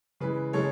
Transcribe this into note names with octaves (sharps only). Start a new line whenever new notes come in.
C#3 E3 G#3 B4
C#3 E3 G#3 A4 C#5